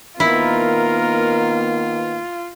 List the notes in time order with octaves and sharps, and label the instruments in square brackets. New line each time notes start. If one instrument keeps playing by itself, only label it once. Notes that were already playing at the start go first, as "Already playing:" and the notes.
[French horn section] D#3 A#3 B3 [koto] E4 [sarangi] F4 [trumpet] A#4